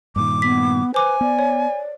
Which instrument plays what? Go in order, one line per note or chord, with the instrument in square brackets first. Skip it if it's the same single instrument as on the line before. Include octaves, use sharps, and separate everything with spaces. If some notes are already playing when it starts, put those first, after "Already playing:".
[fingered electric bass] G2 A#2 D#3 [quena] D6
[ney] B3 [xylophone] B6
[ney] B4 [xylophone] C5 D6 [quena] G#5
[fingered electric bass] B3 [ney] D5
[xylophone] C#5